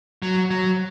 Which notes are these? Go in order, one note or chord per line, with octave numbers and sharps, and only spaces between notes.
F#3
F#3